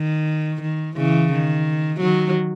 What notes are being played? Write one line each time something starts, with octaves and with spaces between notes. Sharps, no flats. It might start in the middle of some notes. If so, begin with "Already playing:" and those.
Already playing: D#3
D#3
C#3 E3
D#3
D#3 F#3